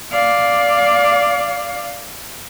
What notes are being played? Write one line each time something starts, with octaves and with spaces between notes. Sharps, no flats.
D5 F5